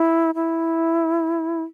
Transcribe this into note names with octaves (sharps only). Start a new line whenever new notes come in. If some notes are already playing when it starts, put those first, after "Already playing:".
Already playing: E4
E4